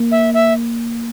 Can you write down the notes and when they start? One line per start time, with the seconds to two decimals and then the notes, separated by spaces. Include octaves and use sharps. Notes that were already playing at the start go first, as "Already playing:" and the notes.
Already playing: A#3
0.12 E5
0.34 E5